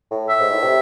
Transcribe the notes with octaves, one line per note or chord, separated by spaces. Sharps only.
A2
E5
G#2
A2
C3